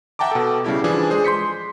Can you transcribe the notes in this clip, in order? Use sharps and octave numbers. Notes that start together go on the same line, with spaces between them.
E5 F#5 G5 A5 A#5 D6
B2 A4
C#3 G3 E4 G4
E3 F3 D4 G#4
G#3 G#4 C5
C6 G6 B6 C#7